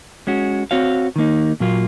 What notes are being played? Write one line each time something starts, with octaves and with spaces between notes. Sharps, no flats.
G#3 C#4 F#4
C4 F#4 C#5 F5
D#3 A#3 D#4
A#2 F#3 A#3 F4